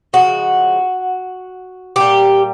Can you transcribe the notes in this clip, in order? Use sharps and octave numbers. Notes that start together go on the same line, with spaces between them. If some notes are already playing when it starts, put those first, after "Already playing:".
C#3 F3 G#3 F#4
A#2 G3 G4